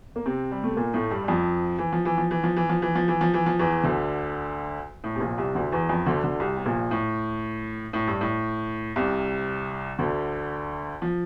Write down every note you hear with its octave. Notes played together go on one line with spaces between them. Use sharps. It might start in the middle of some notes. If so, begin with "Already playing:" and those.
A#3
C3 C4
G3
A3
A#2 A#3
A2 A3
G2 G3
G3
F2 F3
E3
F3
E3
F3
E3
F3
E3
F3
E3
F3
E3
F3
E3
F3
E2 E3
D2 D3
A2
C3
A#1 A#2
C2 C3
D2 D3
E2 E3
F2 F3
D2 D3
D2 D3
C2 C3
C3
A#1 A#2
A2
A2
G2
A2
C2 C3
D2 D3
F3